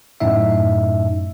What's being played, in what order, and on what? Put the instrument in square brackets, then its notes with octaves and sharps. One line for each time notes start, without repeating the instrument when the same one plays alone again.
[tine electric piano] F#2 A2 D#4 E5